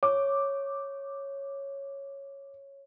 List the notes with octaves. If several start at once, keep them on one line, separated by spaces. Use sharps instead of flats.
C#5 D6